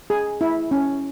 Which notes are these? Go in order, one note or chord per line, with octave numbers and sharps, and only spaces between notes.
G#4
E4
C#4